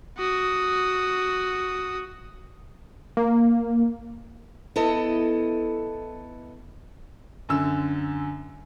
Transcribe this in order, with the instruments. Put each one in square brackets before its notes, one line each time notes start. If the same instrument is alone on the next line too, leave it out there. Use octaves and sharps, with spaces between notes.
[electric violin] F#4 D#6
[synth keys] A#3
[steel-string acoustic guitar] B3 E4 A4 D#5
[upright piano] F#2 D3 E6